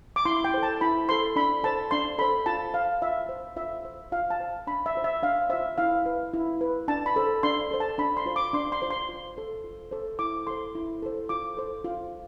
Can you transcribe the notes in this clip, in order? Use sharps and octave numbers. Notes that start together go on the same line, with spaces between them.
D6
E4 C6
G5
A4 C5
A5
E4 B5
A4 C5 C6
D4 B5
A4 C5 A5
D4 C6
A4 C5 B5
F4 A5
C5 F5
F4 E5
C5
F4 E5
C5
F4 F5
A5
C5
D4 B5
E5
F4 C5
E5
D4 F5
F4 C5 E5
E4 F5
B4
E4
B4
D4 A5
B5
A4 C5
D4 C6
A4 C5
A5
D4 B5
C6
F4 C5
D6
D4 C6
C6
F4 C5
C6
F4
A4 C5
F4
A4 C5
E4 D6
A4 C5 C6
E4
A4 C5
F4 D6
A4 C5
F4